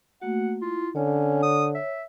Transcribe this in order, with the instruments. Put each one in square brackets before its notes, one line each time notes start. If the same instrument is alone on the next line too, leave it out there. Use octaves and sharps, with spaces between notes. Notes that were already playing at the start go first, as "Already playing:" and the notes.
[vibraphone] A3 A#3 F#4 [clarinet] F#5
[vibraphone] E4 [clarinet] F4
[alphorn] D3 [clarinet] C#4 [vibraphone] C#5
[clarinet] D#6
E5